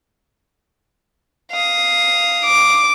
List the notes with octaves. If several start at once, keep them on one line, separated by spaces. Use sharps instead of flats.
F5 D#6
D6